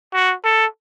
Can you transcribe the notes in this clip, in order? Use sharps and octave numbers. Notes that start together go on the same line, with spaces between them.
F#4
A4